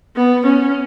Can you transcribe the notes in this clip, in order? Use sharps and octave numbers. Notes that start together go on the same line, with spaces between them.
B3
C#4